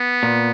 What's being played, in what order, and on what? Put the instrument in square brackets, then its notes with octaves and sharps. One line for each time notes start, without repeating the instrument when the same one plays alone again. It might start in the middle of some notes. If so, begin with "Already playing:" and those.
Already playing: [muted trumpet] B3
[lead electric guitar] A#2